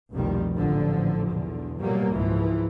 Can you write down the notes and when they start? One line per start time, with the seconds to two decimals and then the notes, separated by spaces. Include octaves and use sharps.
0.12 F1 C2 B2 D#3 F3 G3
0.55 A1 A#2 D3 F3
1.29 B1 E2 D3
1.78 G#2 B2 F#3 G3 A#3
2.11 G#1 C#2 G#2 E3 F3